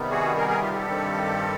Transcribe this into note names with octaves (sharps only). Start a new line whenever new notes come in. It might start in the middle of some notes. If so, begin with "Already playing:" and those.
Already playing: C3 D#3 G3 B3
F#4 G#4
G#4 A#4
G#4 A#4
F4 G4
G4 A4
G2 D#3 G3 C4